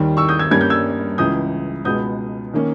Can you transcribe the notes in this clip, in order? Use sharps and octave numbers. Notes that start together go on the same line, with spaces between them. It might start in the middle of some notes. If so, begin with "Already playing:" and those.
Already playing: D#2 D#3 G3
C#6 E6
D#6 G6
E6 G#6
G2 G3 A#3 C#4 G#6
G6
E6 G#6
C#2 C#3 E3 D#6 G6
C#2 B2 G#3 B3 D#6 G6
D#3 A#3 C#4